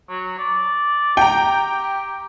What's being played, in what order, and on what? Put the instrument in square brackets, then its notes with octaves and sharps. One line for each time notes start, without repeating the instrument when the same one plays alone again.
[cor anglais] F#3
D5
[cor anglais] G4 [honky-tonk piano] G5 A#5